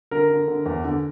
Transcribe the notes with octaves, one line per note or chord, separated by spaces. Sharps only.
D3 A#4
D3
D3
E2
D3